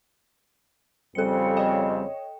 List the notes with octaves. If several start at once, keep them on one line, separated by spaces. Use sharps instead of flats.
F2 C#3 G3 C4 A4 C#7
C#5 D#5 G5